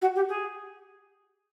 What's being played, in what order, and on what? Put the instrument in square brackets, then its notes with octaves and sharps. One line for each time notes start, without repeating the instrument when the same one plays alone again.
[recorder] F#4
G4
G#4